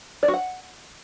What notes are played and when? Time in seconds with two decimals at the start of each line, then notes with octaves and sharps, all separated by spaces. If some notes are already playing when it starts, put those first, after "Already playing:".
0.23 D5
0.28 F#4
0.34 F#5